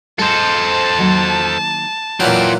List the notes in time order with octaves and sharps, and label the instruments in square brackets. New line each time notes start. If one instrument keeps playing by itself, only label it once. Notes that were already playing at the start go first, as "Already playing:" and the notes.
[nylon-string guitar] G#3 G#4 D#5 [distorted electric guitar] A4 C5 [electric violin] A5
[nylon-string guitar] D#3 F#3 A#3
[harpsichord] A#2 E3 F#3 [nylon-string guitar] D4 E4 [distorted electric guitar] F4 G5